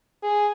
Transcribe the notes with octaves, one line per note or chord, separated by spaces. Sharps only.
G#4